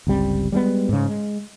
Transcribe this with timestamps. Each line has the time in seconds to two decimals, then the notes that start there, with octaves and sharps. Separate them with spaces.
0.07 G1 C#2 G3 C4
0.52 G3 G#3 A#3 B3
0.89 G#2 C#3
1.08 G#3